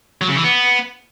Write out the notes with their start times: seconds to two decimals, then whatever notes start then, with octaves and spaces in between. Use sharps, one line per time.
0.21 F#3
0.29 C#3
0.36 E3
0.44 B3